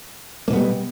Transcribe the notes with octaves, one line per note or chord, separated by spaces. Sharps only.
B2 G3 A#3 B3